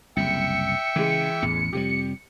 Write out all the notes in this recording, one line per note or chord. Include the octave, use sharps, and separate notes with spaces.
F#1 C2 E5 G5 E6 C#7
C#3 E3 G#3
A1 E2
F2 C3 G3 G4